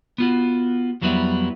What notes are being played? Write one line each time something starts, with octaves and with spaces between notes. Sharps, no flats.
B3 F4 F#4
F2 F#3 G3 B3 E4